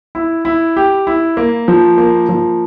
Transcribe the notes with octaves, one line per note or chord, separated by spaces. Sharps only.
E4
E4
G4
E4
A#3
F3
A#3
F3